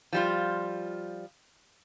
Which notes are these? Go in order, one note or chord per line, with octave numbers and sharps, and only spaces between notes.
F3 G3 F4